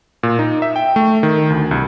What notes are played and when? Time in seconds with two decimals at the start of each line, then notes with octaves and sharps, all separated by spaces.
0.23 A#2
0.39 D#4
0.62 E5
0.76 G5
0.96 A3
1.23 D#3
1.50 D2
1.71 C2